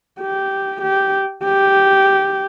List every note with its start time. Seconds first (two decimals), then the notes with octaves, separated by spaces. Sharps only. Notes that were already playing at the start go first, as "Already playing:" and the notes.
0.20 G4
0.82 G4
1.44 G4